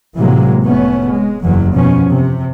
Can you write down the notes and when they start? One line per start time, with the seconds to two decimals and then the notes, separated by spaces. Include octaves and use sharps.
0.18 A2 C3 E3 F#3 G#3 A#3
0.64 F1 A3 B3 C#4
1.10 G#3
1.42 F#1 E2 E3 F#3
1.74 B2 F3 B3 C#4
2.09 C3